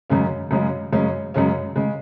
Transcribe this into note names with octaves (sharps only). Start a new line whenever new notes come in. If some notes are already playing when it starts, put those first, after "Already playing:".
F#2 C#3 G#3 C#4
F#2 C#3 G#3 C#4
F#2 C#3 G#3 C#4
F#2 C#3 G#3 C#4
C#3 G#3